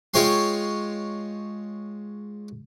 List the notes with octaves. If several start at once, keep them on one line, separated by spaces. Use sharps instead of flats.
G#3 F4 C#5 G5 C6